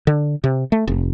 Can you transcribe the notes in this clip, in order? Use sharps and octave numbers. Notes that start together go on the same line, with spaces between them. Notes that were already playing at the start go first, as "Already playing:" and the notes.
D3
C3
A3
F1